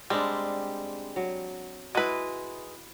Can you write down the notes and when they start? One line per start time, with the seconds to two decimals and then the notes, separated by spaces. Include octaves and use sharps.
0.10 G3 G#3 C4 D4
1.16 F#3
1.95 G#3 E4 F#4 B4